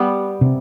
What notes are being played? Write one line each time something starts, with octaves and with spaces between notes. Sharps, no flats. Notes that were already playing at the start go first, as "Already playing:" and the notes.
Already playing: G3 B3
C3